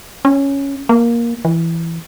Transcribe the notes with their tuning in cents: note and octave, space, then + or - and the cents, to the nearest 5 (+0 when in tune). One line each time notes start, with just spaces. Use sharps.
C#4 +0
A#3 +10
E3 +10